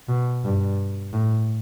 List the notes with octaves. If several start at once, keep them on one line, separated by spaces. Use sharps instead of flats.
B2
G2
A2